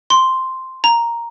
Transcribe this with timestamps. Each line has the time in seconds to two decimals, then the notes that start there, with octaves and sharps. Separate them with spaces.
0.10 C6
0.84 A#5